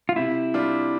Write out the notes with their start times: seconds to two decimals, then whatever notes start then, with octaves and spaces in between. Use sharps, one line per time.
0.09 F4
0.16 C3 E4
0.54 G3 D4 F4